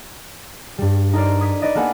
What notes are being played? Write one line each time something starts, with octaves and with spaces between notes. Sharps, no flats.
G2 G3
D#4 A4 A#4 C5 D5
D#6 G#6 B6
D#4 B4 D5 D#5
A#3 B3 A4 B4 F#5 G#5